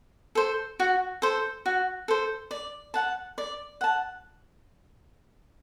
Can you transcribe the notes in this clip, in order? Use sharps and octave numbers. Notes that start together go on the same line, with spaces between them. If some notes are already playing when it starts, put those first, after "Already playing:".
A4 C5
F#4
A4 C5
F#4
A4 C5
D5
F#5 A5
D5
F#5 A5